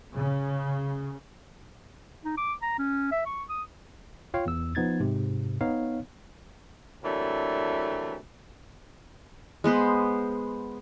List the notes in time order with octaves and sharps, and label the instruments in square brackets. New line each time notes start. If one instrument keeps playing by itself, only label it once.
[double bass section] C#3
[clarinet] D#4
D6
A#5
C#4
E5
C#6
D#6
[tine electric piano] F4 C#5 F5 G5
E2 E6
F3 B3 D#4 G#6 A6
G#2 C3
B3 D#4 C#5 F5
[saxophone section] C3 E3 F#3 A3 A#3 D4
[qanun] G#3 B3 B4 C5